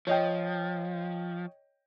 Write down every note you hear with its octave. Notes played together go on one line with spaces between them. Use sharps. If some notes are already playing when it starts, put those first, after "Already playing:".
F3 C#5 D#5 G5